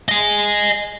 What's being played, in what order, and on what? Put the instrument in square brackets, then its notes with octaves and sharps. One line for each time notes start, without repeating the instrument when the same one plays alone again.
[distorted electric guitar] D#5 G#5